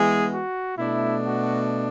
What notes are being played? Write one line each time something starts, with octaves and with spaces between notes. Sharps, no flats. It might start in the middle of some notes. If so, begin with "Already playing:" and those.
Already playing: E3 G#3 B3 G#4
F#4
B2 A3 D4 E4
F#4